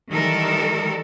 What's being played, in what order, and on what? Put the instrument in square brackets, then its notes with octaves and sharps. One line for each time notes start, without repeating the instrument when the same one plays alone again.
[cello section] D#3 E3 G3 G#3 A4 A#4